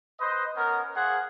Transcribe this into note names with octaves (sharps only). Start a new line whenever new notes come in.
B4 C5 D#5
B3 C#4 A#4
A#3 G#4 C5 F#5